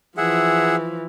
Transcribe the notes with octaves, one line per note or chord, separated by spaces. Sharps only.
E3 F3 G#4 E5 F#5